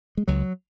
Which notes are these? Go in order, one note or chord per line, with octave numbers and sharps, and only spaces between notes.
G#3
C#2 F#3